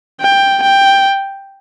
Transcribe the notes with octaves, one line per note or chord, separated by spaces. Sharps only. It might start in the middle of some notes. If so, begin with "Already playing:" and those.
G5
G5